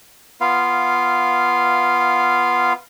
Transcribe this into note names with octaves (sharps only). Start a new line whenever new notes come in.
B3 F4 F5